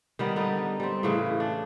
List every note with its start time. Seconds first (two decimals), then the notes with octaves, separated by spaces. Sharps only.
0.19 D#3 G3 B3
0.36 D3 B3 D#4
0.80 G3 C4
1.03 A2 C#3 E3
1.40 D4